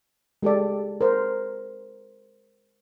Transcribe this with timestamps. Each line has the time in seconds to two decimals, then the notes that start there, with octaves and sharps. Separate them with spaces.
0.43 G#3 G4 A4 D5
1.01 A#4 C5